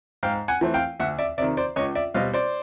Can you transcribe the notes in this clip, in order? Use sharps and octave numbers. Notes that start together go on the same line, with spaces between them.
G#2 F5 G5
F#5 G#5
E3 A3 C4
F5 G5
D2 E5 F#5
D5 E5
C3 D#3 D5 E5
C5 D5
C#2 C#5 D#5
D5 E5
B2 G3 C4 D#5 F5
C5 D5